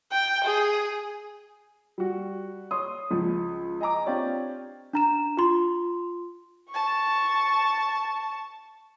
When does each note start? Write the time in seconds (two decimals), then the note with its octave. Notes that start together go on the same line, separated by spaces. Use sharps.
0.12 G5
0.44 G#4
1.98 G3 F#4
2.71 C#5 C6 D#6
3.11 C#2 F3
3.81 D#5 G#5 A#5 D6
4.06 C4 D4 F4 G4 C#5 D5
4.93 D4 A#5 E7
5.37 F4 C6
6.70 A5 C#6